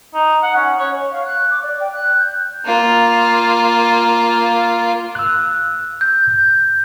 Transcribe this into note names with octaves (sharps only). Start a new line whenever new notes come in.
D#4
F#5
C#4
C#5
F5
F#6
D6
D5
G5
F#6
G6
A#3 F4
E6 F#6
G6